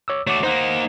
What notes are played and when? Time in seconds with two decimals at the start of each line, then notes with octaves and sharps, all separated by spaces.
0.08 C#5 D6 E6
0.27 A3 F#4 C#5 D6
0.43 A#3 D#4 C5 F#5